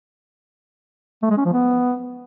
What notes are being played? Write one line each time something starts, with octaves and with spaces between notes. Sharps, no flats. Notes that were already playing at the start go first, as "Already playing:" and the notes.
A3
G#3
C#4
F3
B3